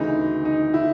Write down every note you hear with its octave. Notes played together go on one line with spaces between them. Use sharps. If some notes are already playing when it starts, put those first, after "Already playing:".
Already playing: D2 C#3 E3 D#4
D#4
E4